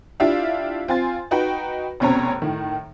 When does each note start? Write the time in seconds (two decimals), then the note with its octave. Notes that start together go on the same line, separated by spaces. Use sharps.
0.20 D4 E4 F4 G4 E5 F5
0.88 C4 F4 G#5 C6 A6
1.31 D#4 F#4 B4 G5
2.00 F1 B2 C4 C#4 C#5 A#5
2.42 A2 D#3